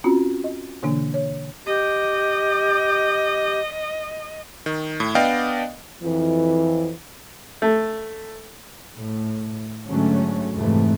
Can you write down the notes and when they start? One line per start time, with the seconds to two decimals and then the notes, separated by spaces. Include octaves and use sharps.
0.04 C4 C#4 F4 F#4
0.44 D#5
0.83 B2 D3 E3 A#3 D4
1.14 C#5
1.66 G4 D#5
4.66 D#3
5.00 A2
5.15 B3 D4 D5 D#5 F5 G5
6.03 F2 E3
7.62 A3
8.95 A2
9.88 G#2 D3 F#3 A3 C#4
10.54 F2 G#2 C3 E3 A3